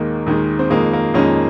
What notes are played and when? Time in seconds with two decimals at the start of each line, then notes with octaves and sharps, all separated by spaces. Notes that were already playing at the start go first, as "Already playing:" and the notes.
Already playing: D#2 D#3 G#3 A#3
0.26 D#2 D#3 G#3
0.59 C4
0.70 F2 D#3 G#3 A#3
0.93 A#3
1.14 F2 D#3 G#3 A#3 C#4